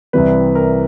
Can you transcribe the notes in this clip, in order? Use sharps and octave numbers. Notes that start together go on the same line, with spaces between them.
C2 C3 E3 G3 B4
A#4